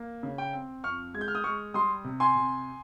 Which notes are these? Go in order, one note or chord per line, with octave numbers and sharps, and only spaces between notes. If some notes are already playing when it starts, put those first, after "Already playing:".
Already playing: A#3
C#3
G5
C4
F2 C#6 F6
G#3 G#6
G6
F6
D#6 G6
G#3 C#6 F6
G3 C6 D#6
C3
G#5 C6
C3